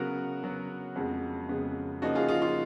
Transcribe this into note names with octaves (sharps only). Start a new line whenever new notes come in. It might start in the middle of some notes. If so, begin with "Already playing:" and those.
Already playing: C#3 F#3 B3 F#4 A#4
C#3 F#3 B3
F2 C#3 G#3 B3
F2 C#3 G#3 B3
C#3 F3 A#3 D#4 F#4
F4 G#4
F4 G#4
F4